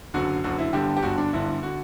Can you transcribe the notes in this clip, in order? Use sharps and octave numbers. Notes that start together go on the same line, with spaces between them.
F#1 F#2 D3 F#4
F#1 F#2 D3 F#4
E4
G1 G2 D3 G4
G4
G1 G2 D3 F#4
D4
G1 G2 D3 E4
D3 F#4